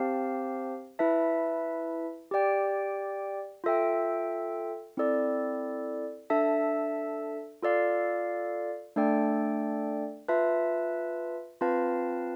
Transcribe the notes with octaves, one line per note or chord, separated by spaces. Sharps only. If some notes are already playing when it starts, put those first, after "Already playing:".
Already playing: C4 G4 C5 F5 A5
E4 B4 E5 A5
G4 D5 G5
F4 A4 E5 G5
C4 E4 A4 D5
D4 A4 E5 A5
F4 A4 D5 F5
A3 D4 A4 D5 G5
F4 B4 E5 A5
C4 F4 B4 F5 A5